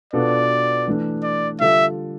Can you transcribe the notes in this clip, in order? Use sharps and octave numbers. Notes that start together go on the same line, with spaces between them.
B2 B3 D4 F4 A4 D5
E3 A3 D4
D5
D3 G3 D4 F4 A4 E5